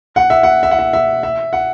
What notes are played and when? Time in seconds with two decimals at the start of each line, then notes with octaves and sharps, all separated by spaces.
0.16 F#5
0.30 E5
0.43 F#5
0.63 E5
0.71 F#5
0.79 E5
0.93 E5
1.23 E5
1.53 F#5